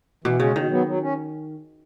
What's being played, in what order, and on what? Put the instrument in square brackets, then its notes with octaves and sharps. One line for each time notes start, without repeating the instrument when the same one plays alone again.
[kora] B2 [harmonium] E3
[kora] C#3 [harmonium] G#3 C#4
[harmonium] B2 [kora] D#3
[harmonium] F#3 B3
F#3
C#4